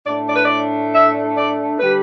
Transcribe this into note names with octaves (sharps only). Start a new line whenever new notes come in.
A2 A3 D4 D5
D5
B4
D5
E5
D5
D3 G3 B4